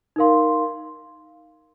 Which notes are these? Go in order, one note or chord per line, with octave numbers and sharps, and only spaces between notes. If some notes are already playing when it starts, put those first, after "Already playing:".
D#4 A#4 F5 C6